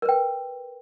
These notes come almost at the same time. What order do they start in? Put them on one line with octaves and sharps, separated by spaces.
A#4 B4 G5